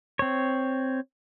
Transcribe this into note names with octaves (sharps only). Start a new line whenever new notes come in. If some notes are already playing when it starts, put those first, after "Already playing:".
C4 C#5